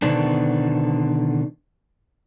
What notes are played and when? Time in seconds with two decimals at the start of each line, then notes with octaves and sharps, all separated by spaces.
0.02 B2 D3 D#3 B3 C4 D4